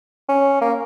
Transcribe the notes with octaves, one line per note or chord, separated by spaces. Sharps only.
C#4
A#3